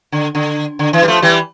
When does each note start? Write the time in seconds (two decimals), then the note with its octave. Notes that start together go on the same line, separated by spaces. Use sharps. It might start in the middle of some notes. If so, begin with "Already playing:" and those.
0.12 D3
0.35 D3
0.79 D3
0.93 E3
1.03 G3
1.08 F3 A3
1.22 E3 G3